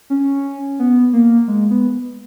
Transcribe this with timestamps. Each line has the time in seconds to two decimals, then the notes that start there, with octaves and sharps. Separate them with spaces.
0.10 C#4
0.79 B3
1.13 A#3
1.48 G#3
1.71 B3